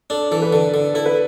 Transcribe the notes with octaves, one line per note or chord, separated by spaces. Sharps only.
D4 A4
E3 A4
B4
D3 A4
D3
E4 A4
B4